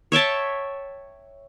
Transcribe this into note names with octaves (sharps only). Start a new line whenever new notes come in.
C#5 E5 G5 A5